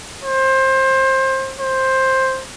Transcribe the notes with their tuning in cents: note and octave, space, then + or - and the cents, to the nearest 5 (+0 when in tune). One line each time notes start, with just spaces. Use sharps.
C5 +25
C5 +10